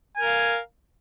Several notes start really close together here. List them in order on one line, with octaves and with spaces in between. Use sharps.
G#5 A#4 F5